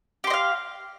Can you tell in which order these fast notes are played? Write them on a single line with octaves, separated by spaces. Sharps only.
G4 C6 D#5 F5